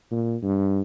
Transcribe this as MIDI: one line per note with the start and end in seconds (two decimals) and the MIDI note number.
0.11 0.35 46
0.43 0.81 43